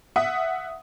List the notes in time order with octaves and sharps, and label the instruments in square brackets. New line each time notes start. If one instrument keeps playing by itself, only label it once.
[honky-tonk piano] E5 F#5 D#6